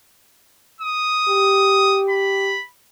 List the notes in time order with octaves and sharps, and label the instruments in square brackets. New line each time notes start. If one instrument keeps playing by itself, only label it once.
[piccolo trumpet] D#6
[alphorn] G4
[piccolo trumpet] B5